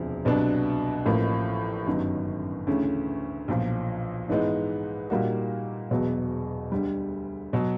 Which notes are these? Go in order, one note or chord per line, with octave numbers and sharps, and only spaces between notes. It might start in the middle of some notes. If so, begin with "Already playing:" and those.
Already playing: E1 D2 C3 F3
C2 B2 F#3 B3 D4
A1 A2 F3 A#3
G1 F#2 D#3 F#3
D2 C#3 E3 A3 C#4
B1 A#2 F3
G#2 E3 G#3 B3 D#4
A#2 G3 A#3 D#4 F#4
E1 E2 B2 F#3
D2 D3 G3
B2 F#3